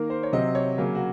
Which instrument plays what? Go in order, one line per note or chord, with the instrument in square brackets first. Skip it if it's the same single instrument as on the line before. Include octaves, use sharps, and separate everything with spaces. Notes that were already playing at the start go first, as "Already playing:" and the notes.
Already playing: [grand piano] D#3 A#3 A#4
C5
C#5
C3 F#3 C4 D#5
C#5
C#3 F#3 A#3
F#4